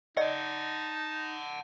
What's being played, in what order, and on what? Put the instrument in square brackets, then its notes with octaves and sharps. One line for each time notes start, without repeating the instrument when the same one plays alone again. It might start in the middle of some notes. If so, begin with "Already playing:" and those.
[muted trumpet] D#4 [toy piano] D5 D#5 [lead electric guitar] F#5 A5